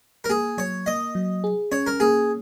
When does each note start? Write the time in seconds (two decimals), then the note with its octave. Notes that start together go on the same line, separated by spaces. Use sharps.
0.24 A#4
0.29 A#3 G#4
0.58 F#3 C#5
0.86 A#3 D#5
1.15 F#3
1.44 G#4
1.72 C#4 C#5
1.87 A#4
2.00 A#3 G#4